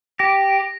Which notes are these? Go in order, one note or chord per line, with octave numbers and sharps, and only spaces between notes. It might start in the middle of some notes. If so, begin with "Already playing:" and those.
G4 A#6